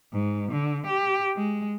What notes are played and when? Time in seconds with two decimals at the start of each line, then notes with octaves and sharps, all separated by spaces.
0.13 G#2
0.52 D3
0.86 G4
1.37 G#3